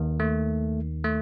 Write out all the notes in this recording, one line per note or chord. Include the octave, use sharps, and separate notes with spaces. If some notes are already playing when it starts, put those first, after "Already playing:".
Already playing: D#2 D#3
A3
A3